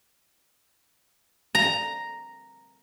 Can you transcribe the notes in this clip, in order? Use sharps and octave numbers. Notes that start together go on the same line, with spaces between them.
A#5